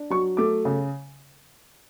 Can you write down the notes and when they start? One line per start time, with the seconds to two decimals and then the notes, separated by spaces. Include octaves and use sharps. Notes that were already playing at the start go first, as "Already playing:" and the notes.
Already playing: D4
0.10 F#3 C#6
0.37 A3 D6
0.65 C#3